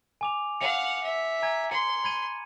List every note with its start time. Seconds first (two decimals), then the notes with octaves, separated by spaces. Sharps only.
0.21 G#5 D6 F7
0.61 F5 F#5 C#7 F7
1.03 E5
1.42 G#5 A#5 G#6
1.71 C6 C#7
2.04 B5 G#6 D#7